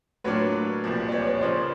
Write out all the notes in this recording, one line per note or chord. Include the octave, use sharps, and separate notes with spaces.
A2 F#3 A#3 D4 F4 B4 C#5
C2 A#2 F3
D5
B4 C#5
B4 C#5
C#3 F3 A#3 C5 D5